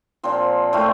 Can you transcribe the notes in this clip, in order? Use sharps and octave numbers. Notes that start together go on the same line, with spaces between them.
A#2 F3 C4
A2 A3 C4 F4